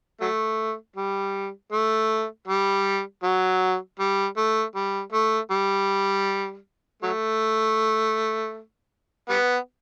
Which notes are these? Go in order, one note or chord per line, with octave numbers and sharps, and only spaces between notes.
F#3 A3
G3
A3
G3
F#3
G3
A3
G3
A3
G3
F#3 A3
G3 B3